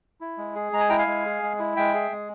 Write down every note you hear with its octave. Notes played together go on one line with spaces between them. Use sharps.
E4
G#3
G#4
G#3 A#5
G#5
E4 G5 A#5
F5 G#5
G#3
G#4
G#3
E4
G#3 E5 G5
G#4
G#3